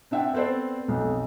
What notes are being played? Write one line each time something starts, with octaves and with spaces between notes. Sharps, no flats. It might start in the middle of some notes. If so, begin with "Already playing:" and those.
C4 D4 E5 F#5 G5
B3 C4 A4 C5 D5
B1 F2